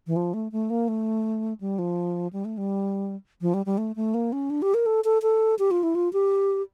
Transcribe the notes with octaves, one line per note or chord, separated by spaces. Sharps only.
E3
F3
A3
A3
A#3
A3
G3
F3
G3
A3
G3
F3
G3
G3
A3
A3
A#3
C#4
D4
G4
A#4
A4
A4
A4
G4
F4
E4
F4
G4